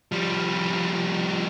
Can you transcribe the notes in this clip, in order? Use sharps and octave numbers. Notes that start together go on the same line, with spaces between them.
F3 G3